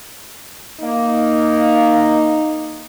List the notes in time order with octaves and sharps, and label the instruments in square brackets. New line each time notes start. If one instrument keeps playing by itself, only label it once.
[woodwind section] A#3 [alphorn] D#4